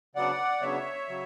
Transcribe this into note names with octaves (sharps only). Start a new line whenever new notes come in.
C#3 F#3 B3 D4 D5 F#5
C#3 F#3 B3 D4 C#5 E5
C#3 F#3